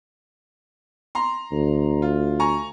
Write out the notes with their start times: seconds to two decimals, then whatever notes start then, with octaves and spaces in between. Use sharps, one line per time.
1.15 A#5 C6
1.52 D2
2.02 F4
2.40 G#5 A#5 C#6